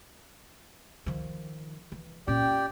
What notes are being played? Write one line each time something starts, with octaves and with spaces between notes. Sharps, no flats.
D#3 F3
E3
A#2 C#4 G4 D5 G5